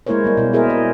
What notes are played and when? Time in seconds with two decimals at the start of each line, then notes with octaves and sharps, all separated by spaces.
0.07 G#3 A#3 E4 A#4 C5 C#5
0.24 G3 A#3
0.37 B2 E4
0.53 E4 G#4 A#4 C5 E5
0.70 D#5